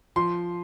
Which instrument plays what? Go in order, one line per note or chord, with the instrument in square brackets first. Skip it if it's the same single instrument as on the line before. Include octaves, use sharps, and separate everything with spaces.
[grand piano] F3 C6